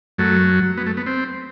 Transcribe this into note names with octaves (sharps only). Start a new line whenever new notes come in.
F#2 F#3 A3
B3
A3
B3
C4